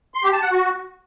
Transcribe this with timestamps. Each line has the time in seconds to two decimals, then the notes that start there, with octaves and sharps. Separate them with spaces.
0.14 C6
0.23 G4
0.33 A5
0.42 F#5
0.51 F#4